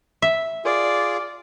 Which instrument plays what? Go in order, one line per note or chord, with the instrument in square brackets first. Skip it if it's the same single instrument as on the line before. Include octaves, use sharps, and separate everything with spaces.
[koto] E5
[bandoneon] F4 G#4 [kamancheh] D5